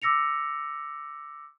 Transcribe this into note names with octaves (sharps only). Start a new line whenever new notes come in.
D6 E6 A#6 C#7 F7